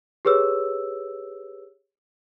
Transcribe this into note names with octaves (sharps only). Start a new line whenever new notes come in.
G4 G#4 B4 C#5 E6